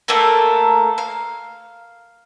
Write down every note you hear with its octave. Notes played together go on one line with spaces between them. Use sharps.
A3 A#3 A4 A#4
F5